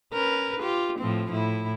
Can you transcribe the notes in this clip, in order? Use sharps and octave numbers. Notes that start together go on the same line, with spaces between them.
C#4 A#4 B4
F4 G4
A2 F3 C4
A2 E4